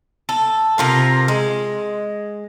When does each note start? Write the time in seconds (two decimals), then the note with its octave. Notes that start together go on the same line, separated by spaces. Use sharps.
0.29 A4
0.78 C3 F4 A#4
1.28 G#3